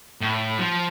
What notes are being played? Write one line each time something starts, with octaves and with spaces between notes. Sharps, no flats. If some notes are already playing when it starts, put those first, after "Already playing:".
A2
F3